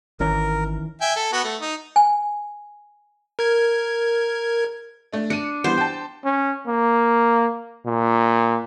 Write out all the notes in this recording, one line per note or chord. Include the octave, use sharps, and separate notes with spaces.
G#1 D#3 E3 C#4 A#4
E5 G5 G#5
A4
B3 F#4
A3
D#4
G#5
A#4 G#6
A3 D4
D4 C#7 D#7
E3 G3 B3 C5
G5 A5
C#4
A#3
A#2